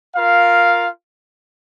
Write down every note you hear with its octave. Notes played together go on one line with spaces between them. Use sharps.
F4 A#4 F5